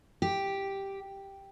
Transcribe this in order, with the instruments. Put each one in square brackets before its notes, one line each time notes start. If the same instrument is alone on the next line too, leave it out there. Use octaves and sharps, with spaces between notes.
[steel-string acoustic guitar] G4